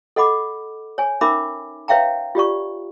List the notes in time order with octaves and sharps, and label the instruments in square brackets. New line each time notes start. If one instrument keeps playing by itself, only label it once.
[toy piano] A4 D#5 F#5 B5 D6
C#5 G#5
C#4 D#4 A#4 E5 B5 D6
B4 C#5 E5 F5 G5 A#5
F4 G4 D5 C#6